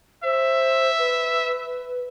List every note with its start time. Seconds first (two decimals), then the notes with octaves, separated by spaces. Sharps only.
0.24 C5 E5
0.99 B4